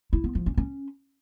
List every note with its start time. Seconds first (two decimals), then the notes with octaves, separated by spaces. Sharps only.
0.13 E4
0.24 B3
0.35 F3
0.46 C#4
0.57 C#4